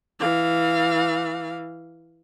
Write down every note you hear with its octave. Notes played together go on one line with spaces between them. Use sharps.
E3 F5